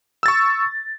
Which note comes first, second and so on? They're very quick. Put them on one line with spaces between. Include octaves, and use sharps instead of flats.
E6 A6 C#6